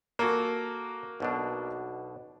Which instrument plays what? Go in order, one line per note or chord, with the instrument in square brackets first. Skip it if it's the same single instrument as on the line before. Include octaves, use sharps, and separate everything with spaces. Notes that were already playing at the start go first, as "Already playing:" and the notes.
[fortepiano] A#3 F#4 [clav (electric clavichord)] A4 G#5
[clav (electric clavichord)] B1 B2 D4